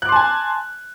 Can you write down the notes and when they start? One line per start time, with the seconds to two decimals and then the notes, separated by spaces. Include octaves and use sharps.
0.02 F#6
0.05 D6
0.09 C6
0.12 A5
0.16 G#5